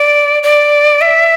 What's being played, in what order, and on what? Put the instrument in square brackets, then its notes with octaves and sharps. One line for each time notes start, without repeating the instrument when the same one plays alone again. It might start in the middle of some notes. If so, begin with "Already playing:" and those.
Already playing: [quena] D5
D5
E5